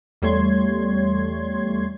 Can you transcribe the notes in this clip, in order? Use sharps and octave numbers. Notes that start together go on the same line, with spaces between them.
E2 G3 A3 C#5 C6 G#6